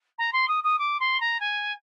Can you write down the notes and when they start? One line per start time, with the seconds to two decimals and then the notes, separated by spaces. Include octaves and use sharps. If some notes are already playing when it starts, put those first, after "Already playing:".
0.18 A#5
0.33 C6
0.48 D#6
0.64 D#6
0.79 D6
1.00 C6
1.20 A#5
1.40 G#5